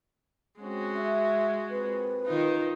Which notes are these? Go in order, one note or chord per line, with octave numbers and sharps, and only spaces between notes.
G#3 C4 C#4 F#4
E5
A#2 C4 B4
D#3 D#4 F4